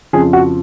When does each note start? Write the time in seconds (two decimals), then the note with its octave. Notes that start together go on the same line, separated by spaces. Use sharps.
0.13 F2 C#3 F3 G#4
0.33 F#4